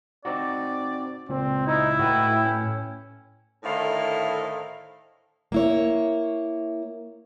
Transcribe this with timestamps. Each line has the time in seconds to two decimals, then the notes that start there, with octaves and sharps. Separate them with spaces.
0.25 C4 D#4 F#4 D5
1.29 C#2 A#2 C4
1.67 D#4 E4
1.99 A2 F#4 B4 G5
2.45 C#4
3.64 A2 D3 D#3 E4 C5 F5
5.52 A#3 E4 C#5